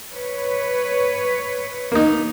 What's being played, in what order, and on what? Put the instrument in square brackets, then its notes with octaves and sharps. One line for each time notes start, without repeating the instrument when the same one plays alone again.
[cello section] B4 C#5
[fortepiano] A#3 D#4